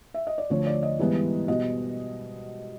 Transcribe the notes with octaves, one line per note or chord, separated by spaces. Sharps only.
E5
D#5
D5
D2 D3 F3 C#5
D5
D#5
G#2 E3 G3 B3
B2 G3 B3 D#5